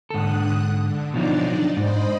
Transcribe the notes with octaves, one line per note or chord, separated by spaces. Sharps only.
G#2 D3 A4 D#6 F#6
D3
B2 F3 F#3 D4 D#4 D5
G#2 C5 D#5 B5